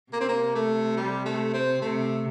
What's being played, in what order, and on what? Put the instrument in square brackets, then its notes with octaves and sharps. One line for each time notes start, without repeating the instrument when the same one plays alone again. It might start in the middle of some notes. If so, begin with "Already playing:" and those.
[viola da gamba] C3 [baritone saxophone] A#3
[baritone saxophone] C4
A#3
A3
G3
A3
C4
[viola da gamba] C3 [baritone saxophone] A3